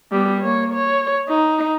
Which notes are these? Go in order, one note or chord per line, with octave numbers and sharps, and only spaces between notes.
G3 B3
A#3 C#5
C#5
D#4